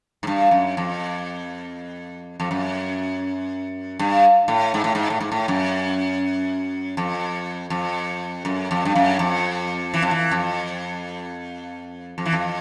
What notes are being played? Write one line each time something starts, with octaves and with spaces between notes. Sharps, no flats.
G#2
G2
F#2
F2
F2
F#2
G2
A2
G#2
A2
G#2
A2
G#2
A2
F#2
F2
F2
F#2
F2
G2
F#2
F2
E3
F2
E3
F2
F2
E3
F2